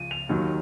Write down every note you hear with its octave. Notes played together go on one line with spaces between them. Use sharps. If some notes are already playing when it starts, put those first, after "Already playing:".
Already playing: C#2 C#3 F3 D#7
F7
D#2 D#3 F#3